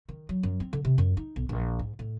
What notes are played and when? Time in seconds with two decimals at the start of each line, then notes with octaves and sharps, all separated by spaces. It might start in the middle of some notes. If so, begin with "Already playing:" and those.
0.09 D#3
0.29 F#3
0.43 F#2
0.60 C4
0.73 D3
0.85 C3
0.98 F#2
1.17 D#4
1.36 B1
1.49 A#1
1.79 G#2
1.99 A2